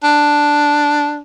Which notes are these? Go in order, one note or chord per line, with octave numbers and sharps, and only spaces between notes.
D4